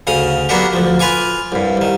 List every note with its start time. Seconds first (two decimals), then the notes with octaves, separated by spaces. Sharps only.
0.07 D2 C#3 F5 D#6
0.49 F#3 A#3 B3 D4 F#4 G4
0.73 D2 F3
1.00 F4 B4 F5 G#5 D6
1.52 C2 G2
1.77 C2 D#3